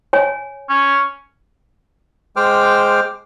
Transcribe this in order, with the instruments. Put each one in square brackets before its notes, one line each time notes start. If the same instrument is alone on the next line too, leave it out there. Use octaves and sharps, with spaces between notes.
[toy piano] C#5 G#5
[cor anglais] C#4
[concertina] G#3 C5 G5 D6 F6